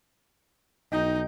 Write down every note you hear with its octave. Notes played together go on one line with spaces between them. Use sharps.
B1 D#4 D#5 G5 G6